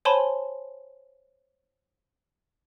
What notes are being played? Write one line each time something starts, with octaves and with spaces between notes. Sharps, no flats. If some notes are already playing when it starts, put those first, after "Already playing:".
C5 C#5 G#5 A5 B5 C6